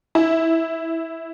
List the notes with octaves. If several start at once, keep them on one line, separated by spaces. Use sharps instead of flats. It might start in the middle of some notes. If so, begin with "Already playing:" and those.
E4